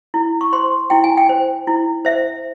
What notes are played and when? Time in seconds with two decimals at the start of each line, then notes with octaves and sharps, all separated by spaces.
0.14 E4
0.41 C#6
0.53 C5 C6
0.90 E4 G5
1.04 G#5
1.17 G5
1.29 C5
1.67 E4
2.05 C5 E5